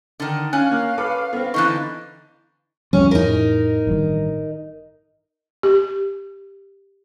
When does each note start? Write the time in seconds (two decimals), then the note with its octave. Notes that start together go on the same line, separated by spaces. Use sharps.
0.20 D3 D#3
0.53 C#4 F5 G#5 F6 F#6
0.71 A#3
0.98 A4 B4 D6
1.33 B3 C4 A4
1.54 D3 E3 D#4 C#6 F#6
2.93 D2 F3 G3 C#4
3.11 F2 A2 D#4 A#4
3.87 A1 G2 D#3
5.63 G4